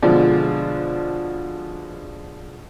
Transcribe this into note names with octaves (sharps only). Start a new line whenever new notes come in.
B2 D3 F3 G#3 D5